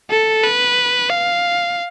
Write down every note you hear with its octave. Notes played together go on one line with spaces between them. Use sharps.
A4
B4
F5